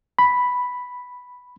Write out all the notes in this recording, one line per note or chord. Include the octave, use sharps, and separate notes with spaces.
B5